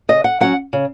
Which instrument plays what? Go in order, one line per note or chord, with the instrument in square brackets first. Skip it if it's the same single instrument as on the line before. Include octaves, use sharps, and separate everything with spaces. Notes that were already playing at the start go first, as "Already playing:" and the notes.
[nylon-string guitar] C#3 D#5
F#5
F#3 C#4 F#5
C#3